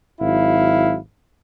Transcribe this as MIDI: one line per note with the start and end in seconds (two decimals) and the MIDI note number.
0.21 0.96 32
0.21 0.96 54
0.21 0.96 64
0.21 0.96 77